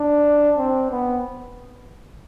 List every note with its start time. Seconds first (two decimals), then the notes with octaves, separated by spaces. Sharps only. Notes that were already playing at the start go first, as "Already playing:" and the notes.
Already playing: D4
0.58 C4
0.90 B3